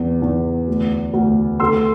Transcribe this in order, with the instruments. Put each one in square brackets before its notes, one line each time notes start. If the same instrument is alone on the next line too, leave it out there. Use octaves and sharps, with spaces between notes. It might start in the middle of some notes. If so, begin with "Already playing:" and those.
Already playing: [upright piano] E2
E2
D2
D2
A3 C6 E6